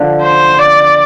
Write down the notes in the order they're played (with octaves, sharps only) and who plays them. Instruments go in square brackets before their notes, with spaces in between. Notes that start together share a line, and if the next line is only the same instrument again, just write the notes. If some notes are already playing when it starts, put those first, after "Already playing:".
Already playing: [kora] D3 F3
[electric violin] C5
D5